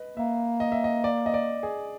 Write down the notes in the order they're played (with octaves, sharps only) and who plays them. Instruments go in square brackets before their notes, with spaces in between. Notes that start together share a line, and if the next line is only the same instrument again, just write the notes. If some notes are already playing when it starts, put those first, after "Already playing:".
Already playing: [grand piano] B4 D#5
[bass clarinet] A#3 [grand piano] E5
[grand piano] D#5
E5
D#5
D5
D#5
D5
G#4